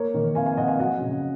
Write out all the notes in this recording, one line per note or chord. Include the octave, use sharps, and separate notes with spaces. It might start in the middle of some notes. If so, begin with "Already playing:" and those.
Already playing: A#3 A#4 C#5
D#3
F2 F5 G#5
F5 G#5
F2 D#5 F#5
F5 G#5
F#3 D#5 F#5
C#3